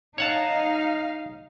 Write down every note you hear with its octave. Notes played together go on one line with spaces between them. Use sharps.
D#4 C#5 F5 F#5 A5